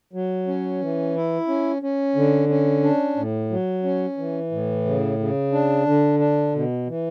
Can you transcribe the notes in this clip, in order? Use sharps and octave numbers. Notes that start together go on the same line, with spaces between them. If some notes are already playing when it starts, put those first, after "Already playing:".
F#3
C#4
E3
E4
C#4
C#4
D3
C#4
D4
A2
F#3
C#4
E3
A2
C#3
C#3
D4
D3
D4
B2
E3